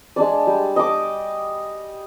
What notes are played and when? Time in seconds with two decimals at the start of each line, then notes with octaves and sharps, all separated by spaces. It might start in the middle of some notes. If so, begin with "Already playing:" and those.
0.16 G#3 D4 D5
0.47 G3
0.76 D#5 D6